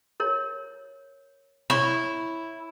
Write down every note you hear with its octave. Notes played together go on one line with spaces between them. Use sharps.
A#4 C#5
E4 C#5 C#6